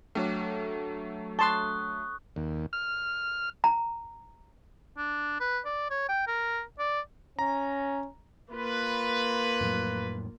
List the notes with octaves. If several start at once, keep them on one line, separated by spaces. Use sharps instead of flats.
F#3 A3 D4 A4 C#5
A5 C6 C#6 D#6 F#6
D#2
F6
A#5
D4
B4
D5
C#5
G5
A#4
D5
C#4 A#5
A#3 F4 B4
F2 A2 F#3